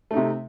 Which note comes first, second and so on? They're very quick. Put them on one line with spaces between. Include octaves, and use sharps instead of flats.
A3 D#4 C3